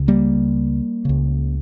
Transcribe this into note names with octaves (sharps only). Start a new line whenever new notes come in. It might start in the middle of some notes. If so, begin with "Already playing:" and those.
Already playing: C#2 C#3
G3 A#3
C#2 C#3